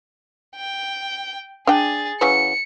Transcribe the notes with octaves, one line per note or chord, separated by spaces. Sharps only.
G5
D4 G#4 G5 A6
C#3 E3 F#3 C#7